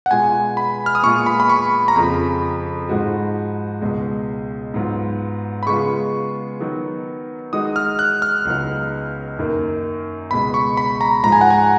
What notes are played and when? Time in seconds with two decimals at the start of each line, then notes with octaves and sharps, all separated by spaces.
0.06 F#5
0.10 B2 G#3 B3 F4 G#5
0.57 B5
0.86 F6
0.95 D#6
1.03 A#2 G#3 B3 F4 C#6
1.26 B5
1.40 B5
1.49 C#6
1.88 A#5
1.96 F2 C#3 F3 B5
2.89 G#2 F3 G#3 D#4 F#4
3.81 C#2 B2 G#3
4.74 G#2 F#3 B3 F4
5.63 B5
5.66 C#3 G#3 B3 F4 C#6
6.60 D#3 F#3 B3
7.53 D#3 G#3 D#4 F#4 D#6
7.76 F6
7.99 F#6
8.22 F6
8.45 C#2 C#3 F#3 B3 D#4
9.39 F#2 D#3 A#3
10.31 C#2 B2 G#3 B5
10.54 C#6
10.77 B5
11.01 A#5
11.23 G#2 F3 G#3 A#5
11.32 G#5
11.41 F#5
11.50 G#5